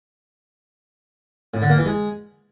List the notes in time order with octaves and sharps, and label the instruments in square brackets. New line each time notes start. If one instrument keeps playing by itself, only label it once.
[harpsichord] A2
D3
A#3
E3
G#3